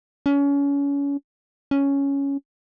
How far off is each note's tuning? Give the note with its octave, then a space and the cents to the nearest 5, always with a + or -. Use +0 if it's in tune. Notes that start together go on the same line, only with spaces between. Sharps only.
C#4 +30
C#4 +5